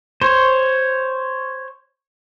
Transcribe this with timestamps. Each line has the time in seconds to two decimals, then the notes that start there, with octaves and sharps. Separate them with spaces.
0.22 C5 C#5